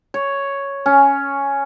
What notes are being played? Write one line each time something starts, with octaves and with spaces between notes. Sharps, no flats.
C#5
C#4